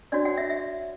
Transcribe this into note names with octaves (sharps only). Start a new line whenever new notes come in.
D4 F#4 C#5 D5
F#5
E5
E5